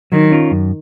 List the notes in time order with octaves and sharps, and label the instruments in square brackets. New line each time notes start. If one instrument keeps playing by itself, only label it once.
[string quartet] D#3 [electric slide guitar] F#3
[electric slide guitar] C#4 F4 A#4
F#2